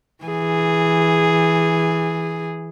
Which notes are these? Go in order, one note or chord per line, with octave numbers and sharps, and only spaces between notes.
E3 G#4